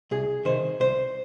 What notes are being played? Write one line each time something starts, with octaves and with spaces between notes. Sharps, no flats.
C2 G#4
C3 D#3 C5
C2 C5